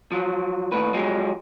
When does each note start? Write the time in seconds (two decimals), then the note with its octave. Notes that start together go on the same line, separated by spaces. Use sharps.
0.12 F3 F#3
0.72 D#2 A2 B4
0.94 F3 F#3 G#3 G4